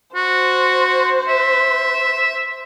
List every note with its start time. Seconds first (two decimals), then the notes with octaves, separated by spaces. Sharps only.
0.15 F#4 C5
1.28 E5